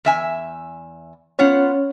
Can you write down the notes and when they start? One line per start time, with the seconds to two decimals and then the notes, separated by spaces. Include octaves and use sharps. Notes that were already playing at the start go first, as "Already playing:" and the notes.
0.05 E2 E5 G#5
1.39 B3 C#4 F4 C#5 F#5